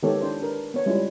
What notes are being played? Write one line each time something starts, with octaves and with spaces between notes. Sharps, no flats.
D#3 G#3 B3 G4 A4 C#5
D4 E4 C5
D4 A#4 B4
B3 C#5
G3 G#3 C#4 E4 F4